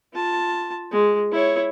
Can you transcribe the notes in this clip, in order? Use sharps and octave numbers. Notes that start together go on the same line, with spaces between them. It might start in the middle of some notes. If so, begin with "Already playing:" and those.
F4 A5
G#3
E4 C#5